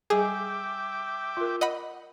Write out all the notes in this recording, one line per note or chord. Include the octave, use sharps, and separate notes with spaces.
G3 G#4 E5 G5 G#5 D6
F4 A#4
D#5 F#5 B5